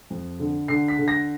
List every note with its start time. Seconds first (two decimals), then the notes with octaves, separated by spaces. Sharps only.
0.10 F2
0.40 D3
0.68 D3 C7
0.88 B6
0.99 D3
1.08 A#6